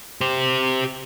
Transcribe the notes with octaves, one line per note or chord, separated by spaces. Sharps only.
G4 C5